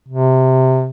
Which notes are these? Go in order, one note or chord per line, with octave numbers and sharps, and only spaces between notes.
C3